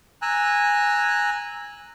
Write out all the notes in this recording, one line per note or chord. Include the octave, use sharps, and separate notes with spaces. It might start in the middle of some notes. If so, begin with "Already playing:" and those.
G#5 A#5 E6 F#6